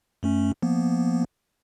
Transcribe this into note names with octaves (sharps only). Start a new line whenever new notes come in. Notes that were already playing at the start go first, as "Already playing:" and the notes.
F#2 A3 C#4
F3 A#3 B3